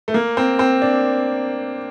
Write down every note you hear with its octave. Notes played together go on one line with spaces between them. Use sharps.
A3
A#3
C4
C4
D4